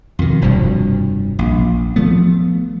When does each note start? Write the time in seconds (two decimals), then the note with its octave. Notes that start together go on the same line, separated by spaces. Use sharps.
0.19 F2 B2 D#3
0.42 F1 G2 B2 F3
1.39 A#1
1.96 F3 A3 B3